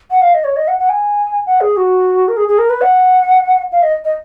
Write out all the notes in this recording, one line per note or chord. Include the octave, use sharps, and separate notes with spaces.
F#5
F5
D#5
C#5
D#5
F#5
F#5
G#5
F#5
G#4
F#4
A#4
G#4
G#4
A#4
B4
F#5
F5
D#5
D#5